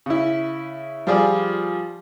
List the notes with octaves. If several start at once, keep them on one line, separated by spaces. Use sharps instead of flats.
C#3 E4
F3 G3 F4 G#4 D5